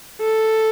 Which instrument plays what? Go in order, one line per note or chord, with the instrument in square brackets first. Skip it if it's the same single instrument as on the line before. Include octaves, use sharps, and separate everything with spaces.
[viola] A4